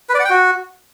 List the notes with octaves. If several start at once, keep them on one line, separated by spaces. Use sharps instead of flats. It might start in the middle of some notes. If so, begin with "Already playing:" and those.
B4
D5
F#5
G5
F#4